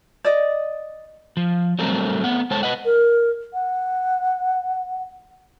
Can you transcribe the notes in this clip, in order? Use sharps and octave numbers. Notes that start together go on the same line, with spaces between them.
D5 D#5
F3
F#3 G3 A3 C4 A4 A#4
A3 B3 F#5
G#3 A4 C5 C#5 A5
B4 D#5 F#5
A#4
F#5